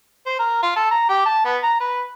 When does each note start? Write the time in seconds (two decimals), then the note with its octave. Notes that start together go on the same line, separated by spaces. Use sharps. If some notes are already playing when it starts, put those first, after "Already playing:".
0.26 C5
0.39 A#4
0.63 F4
0.76 A4
0.91 A#5
1.09 G4
1.25 A5
1.45 B3
1.63 A#5
1.80 B4